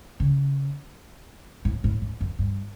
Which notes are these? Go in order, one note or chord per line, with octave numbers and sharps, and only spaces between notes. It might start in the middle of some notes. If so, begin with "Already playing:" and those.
C#3
A2
A2
A2
F#2
G2